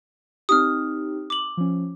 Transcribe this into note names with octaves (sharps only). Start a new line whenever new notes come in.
C4 D#4 G4 D#6 F6
D6 F#7
F3 C#4